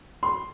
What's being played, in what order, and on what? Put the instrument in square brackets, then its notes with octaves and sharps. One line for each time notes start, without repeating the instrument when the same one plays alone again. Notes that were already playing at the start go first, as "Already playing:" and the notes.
[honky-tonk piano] C6